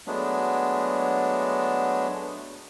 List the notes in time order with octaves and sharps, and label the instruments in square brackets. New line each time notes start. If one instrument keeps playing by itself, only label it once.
[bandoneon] F#3 G#3 A3 B3 D4